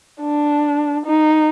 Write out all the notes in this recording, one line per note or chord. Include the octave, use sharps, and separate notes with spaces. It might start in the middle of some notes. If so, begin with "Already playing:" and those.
D4
D#4